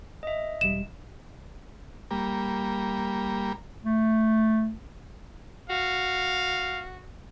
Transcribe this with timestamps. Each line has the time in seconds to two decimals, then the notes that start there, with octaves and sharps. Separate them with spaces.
0.23 D#5 E5
0.61 E1 G3 E7
2.11 G3 A#3
3.84 A3
5.70 F#4 F5